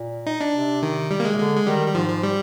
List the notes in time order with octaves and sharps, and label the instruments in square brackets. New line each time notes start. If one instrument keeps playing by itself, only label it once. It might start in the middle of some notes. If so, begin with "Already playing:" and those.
Already playing: [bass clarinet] A#2
[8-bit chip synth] D#4
D4
[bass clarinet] C3
[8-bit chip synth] D#3
G3
A#3
G#3
[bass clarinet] C3
[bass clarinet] D3 [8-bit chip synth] G#3
[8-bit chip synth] G#3
[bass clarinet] D#3 [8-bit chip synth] G3
[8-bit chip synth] G3
[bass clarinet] G#2 [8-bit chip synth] F3
[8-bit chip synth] F3
G3